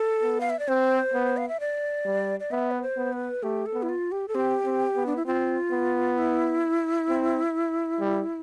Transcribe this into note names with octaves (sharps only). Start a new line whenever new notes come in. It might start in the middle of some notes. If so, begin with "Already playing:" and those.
Already playing: A4
B3
F5
E5
D5
C4 C5
B3
F5
E5
D5
G3
D5
B3 E5
B4
C5
B3
B4
A3 G4
A4
B3
E4
F4
G4
A4
C4 G4
C4
B3
D4
E4
C4 F4
B3
E4
C4
G3